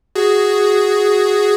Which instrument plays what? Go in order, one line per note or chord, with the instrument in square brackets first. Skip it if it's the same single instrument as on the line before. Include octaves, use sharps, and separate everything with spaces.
[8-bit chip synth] F#4 G#4